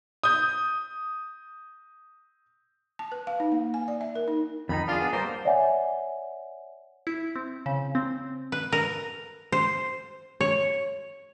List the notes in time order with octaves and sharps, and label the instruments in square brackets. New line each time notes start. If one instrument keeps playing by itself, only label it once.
[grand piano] D#6 G6
[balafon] A5
B4
F5
D#4
A#3
G#5
D5
E5
A#4
D#4
[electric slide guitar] F2 D#3 D#4 [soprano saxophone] B5
[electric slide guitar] D4 G#4 [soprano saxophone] F4
[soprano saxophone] B3
[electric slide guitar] G3 G#3 A#3 [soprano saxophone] C5
[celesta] C#5 D5 E5 F#5 G#5
[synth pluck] E4
C4
C#3
C4
[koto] B4
A#4
C5
C#5